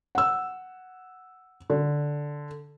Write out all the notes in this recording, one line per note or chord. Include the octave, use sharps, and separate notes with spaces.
F#5 E6
D3